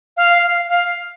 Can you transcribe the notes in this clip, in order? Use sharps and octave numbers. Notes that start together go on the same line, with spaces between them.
F5
F5
F5